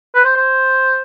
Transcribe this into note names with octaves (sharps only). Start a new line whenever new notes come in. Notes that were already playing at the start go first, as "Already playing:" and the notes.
B4
C5
C5